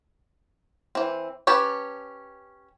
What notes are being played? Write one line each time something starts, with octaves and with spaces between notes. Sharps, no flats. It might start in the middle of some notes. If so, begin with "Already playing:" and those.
E3 C4
C#4 G4 B4 C#5 A5